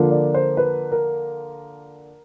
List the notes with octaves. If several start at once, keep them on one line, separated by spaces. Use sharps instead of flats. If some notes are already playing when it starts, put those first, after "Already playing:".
Already playing: D3 F3 A#3
D5
C5
B4
A#4